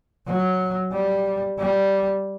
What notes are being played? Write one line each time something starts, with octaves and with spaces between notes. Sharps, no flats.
F#3
G3
G3